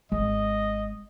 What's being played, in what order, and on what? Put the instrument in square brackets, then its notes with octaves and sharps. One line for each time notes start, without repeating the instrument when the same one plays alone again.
[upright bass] G#1 [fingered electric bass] G#3 [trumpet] D#5